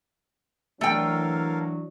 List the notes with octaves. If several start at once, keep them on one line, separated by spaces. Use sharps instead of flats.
E3 F#3 A3 D4 A4 A#4 F5 G5